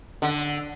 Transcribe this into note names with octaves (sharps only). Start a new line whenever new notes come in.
D3